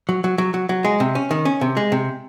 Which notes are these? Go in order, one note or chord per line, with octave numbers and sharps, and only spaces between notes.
F#3
F#3
F#3
F#3
F#3
G#3
C3
C#4
D#3
C#4
C3
G#3
C3